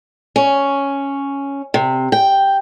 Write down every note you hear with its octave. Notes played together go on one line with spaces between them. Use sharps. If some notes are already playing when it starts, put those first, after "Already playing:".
C#4
C3
G5